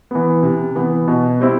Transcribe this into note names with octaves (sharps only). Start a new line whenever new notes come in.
E3 B3
C3
E3 B3
B2
G3 C4 E4